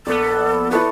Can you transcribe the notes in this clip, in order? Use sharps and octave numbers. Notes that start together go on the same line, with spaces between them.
A#1 B3 A4 D5
E4 A4 B4 C#6